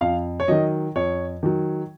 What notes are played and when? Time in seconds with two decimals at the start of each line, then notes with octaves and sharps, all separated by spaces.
0.01 F2 F5
0.40 C#5
0.48 D#3 F#3 D#5
0.95 F2 C#5
1.43 D#3 F#3